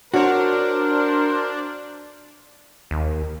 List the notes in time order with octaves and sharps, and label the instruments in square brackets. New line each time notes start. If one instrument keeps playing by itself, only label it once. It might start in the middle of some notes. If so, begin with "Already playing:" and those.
[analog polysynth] D4 [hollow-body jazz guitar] F#4 C#5 [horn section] A#4 C5
[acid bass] D#2